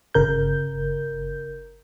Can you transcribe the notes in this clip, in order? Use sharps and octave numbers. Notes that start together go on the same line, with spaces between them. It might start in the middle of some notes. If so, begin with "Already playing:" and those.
G1 C#3 A#4 G6